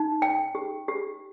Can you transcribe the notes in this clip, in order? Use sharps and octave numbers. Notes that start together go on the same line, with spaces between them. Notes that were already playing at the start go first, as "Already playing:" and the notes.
Already playing: D#4
G5
G4
G4